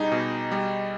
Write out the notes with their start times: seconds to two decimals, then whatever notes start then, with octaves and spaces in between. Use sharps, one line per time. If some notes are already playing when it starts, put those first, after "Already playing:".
Already playing: B2 G3 D#4 G4 G#4
0.12 B2
0.52 G3